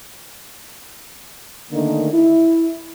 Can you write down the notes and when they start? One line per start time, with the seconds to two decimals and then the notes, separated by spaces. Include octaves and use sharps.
1.71 D3 D#3 A3 A#3 D4 D#4
2.12 E4